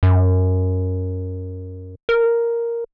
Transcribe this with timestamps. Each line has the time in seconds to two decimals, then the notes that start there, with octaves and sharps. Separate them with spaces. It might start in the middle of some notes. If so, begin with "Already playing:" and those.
0.03 F#2
2.09 A#4